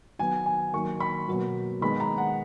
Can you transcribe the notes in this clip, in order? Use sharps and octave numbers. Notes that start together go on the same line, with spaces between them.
D#3 F#3 B3 G#5
G#5
D#3 F#3 A#3 C#6
B5
B2 F#3 A#3
D#3 G#3 B3 B5
A#5
F#5